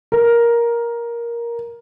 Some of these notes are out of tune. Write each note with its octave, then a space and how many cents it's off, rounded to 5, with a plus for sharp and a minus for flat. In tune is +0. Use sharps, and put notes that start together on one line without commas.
A#4 +10